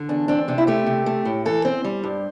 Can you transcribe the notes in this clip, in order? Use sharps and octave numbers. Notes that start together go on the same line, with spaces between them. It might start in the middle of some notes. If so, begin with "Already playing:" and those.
Already playing: D3
E2 D4
C4 D4
C3 D4
E4
A3 G4
C3
A3
A2
E3 A4
C4 C5
G3
G2